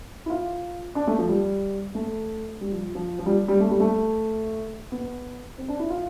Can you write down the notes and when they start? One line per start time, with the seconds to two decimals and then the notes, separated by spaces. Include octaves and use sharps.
0.26 E4
0.30 F4
0.95 D4
1.07 A3
1.19 F3
1.29 G3
1.95 A3
2.61 G3
2.72 F3
2.95 F3
3.19 F3
3.26 G3
3.48 G3
3.60 A3
3.70 G3
3.80 A3
4.92 B3
5.58 C4
5.68 D4
5.80 E4
5.90 F4